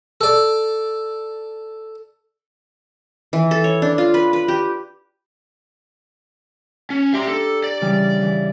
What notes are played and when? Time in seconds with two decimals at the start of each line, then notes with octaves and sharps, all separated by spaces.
0.21 A4 D5
3.33 E3
3.51 A4
3.64 C#5
3.82 D4
3.98 F4
4.14 B4
4.33 B4
4.48 G4
6.90 C#4
7.14 G4 D5 E5 A#5 C6
7.28 D4 A4
7.64 D5
7.81 C#3 E3 G3
8.21 E3